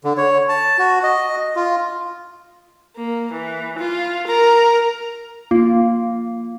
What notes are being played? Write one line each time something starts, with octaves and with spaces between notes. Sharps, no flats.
D3
C#5
A5
F#4
D#5
F4
A#3
E3
F4
A#4
A#3 F4